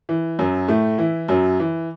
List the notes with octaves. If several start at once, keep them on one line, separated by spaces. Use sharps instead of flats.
E3
F#2 F#3
A2 A3
E3 E4
F#2 F#3
E3